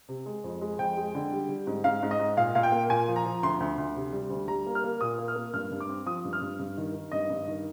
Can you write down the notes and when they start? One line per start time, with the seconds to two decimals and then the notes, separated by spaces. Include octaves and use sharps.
0.09 C3
0.26 G#3
0.44 F2
0.61 G#3
0.79 F2 G5
0.97 G#3
1.15 D3
1.32 G3
1.49 G3
1.67 G#2
1.84 G#2 F5
2.03 G#2
2.11 D#5
2.19 G#2
2.37 A#2 F5
2.55 A#2 F5
2.63 G5
2.72 A#3
2.89 A#2 G#5
3.08 F3
3.16 A#5
3.25 F3
3.43 D2 C6
3.60 D2
3.78 D2
3.96 C3
4.13 G3
4.30 D2
4.48 G3 A#5
4.66 A#3
4.75 F6
4.84 A#3
5.01 A#2 D#6
5.18 A#3
5.28 F6
5.36 A#3
5.53 G2 F6
5.71 G2
5.80 D6
5.89 C4
6.06 F3 D#6
6.25 G2
6.33 F6
6.41 G2
6.59 G2
6.77 D#3
6.94 D#3
7.12 G2 D#5
7.30 G2
7.48 D#3